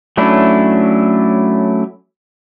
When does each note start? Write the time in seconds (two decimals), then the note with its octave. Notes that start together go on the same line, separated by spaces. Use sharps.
0.17 F#3 A3 C#4 D4 E4